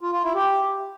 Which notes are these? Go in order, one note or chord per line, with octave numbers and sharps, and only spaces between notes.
F4
F4
E4
G4